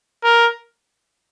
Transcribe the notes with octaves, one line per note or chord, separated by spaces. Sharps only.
A#4